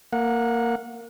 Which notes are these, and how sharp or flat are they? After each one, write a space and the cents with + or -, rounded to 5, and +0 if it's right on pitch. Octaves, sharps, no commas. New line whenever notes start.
A#3 -10 F#5 -25